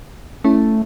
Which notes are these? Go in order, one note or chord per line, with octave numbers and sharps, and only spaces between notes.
A3 C#4 E4